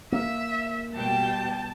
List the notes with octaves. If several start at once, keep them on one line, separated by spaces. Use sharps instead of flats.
A#3 E5
B2 G3 G5 A5